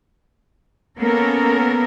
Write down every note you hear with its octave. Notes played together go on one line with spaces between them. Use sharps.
A#3 B3 C#4 A4 A#4